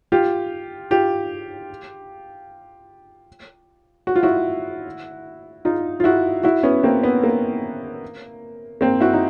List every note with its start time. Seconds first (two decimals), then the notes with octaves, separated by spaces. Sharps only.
0.12 F4 G4
0.91 F4 G4
4.07 F#4
4.16 F4
4.23 E4 F#4
5.65 D#4 F4
6.00 F4
6.04 E4 F#4
6.44 E4 F#4
6.63 B3 C#4
6.83 A#3 C4
7.03 B3
7.24 A#3
8.81 A#3 C4
9.01 E4 F#4
9.14 D#4